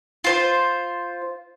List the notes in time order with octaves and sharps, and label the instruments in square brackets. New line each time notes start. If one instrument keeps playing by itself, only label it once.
[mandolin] F4 C5